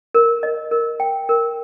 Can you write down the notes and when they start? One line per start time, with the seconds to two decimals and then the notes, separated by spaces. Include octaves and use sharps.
0.15 A#4
0.43 D#5
0.71 A#4
1.00 G5
1.29 A#4